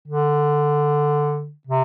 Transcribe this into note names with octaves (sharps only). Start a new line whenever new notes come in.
D3
C3